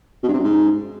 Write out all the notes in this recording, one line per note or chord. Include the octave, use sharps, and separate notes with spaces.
B2
G2
C3
F#2
G#2